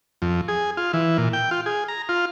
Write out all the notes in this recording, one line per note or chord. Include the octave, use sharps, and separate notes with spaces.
F2
G#4
F4
E3
A#2
G5
F4
G#4
A#5
F4